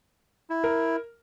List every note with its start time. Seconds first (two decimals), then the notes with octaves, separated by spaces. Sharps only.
0.50 E4
0.64 A#4